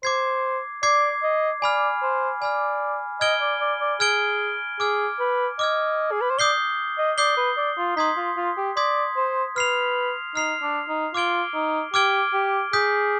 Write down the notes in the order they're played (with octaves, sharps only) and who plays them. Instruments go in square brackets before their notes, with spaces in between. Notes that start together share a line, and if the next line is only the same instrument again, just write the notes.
[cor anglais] C5 [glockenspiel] D6 G#6 C7
[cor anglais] D5 [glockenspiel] D6 G#6 C7
[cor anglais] D#5
[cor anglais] D5 [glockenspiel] G#5 B5 F6
[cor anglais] C5
[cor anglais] D5 [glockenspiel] G#5 B5 F6
[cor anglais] D#5 [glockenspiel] F6 G#6 D7 G7
[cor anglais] D5
D5
D5
[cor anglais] G#4 [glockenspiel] F6 G#6 D7 G7
[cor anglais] G#4 [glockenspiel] D6 F6 G#6
[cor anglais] B4
[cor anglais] D#5 [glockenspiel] D6 F6 G#6
[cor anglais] G#4
B4
C5
[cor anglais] D5 [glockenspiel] D#6 G6 C7 G7
[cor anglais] D#5
[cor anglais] D5 [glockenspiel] D#6 G6 C7 G7
[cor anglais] B4
D5
F4
[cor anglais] D#4 [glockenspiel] C6 D#6 G#6 B6
[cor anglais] F4
F4
G4
[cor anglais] D5 [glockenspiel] C6 D#6 G#6 B6
[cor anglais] C5
[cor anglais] B4 [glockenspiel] F6 C7 F7
[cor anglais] D#4 [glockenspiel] F6 C7 F7
[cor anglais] D4
D#4
[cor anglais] F4 [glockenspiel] D6 F6 G#6 D7 G7
[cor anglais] D#4
[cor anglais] G4 [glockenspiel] D6 F6 G#6 D7 G7
[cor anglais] G4
[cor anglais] G#4 [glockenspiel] D#6 G6 B6